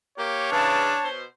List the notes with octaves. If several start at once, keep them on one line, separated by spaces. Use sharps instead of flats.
A#3 G4 C#5
C#3 E3 D4 A5
B2 C5